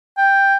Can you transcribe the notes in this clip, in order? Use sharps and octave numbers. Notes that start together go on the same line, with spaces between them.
G5